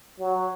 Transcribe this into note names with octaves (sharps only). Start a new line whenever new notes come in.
F#3